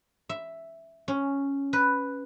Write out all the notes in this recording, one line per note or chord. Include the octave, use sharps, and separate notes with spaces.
E5
C#4
B4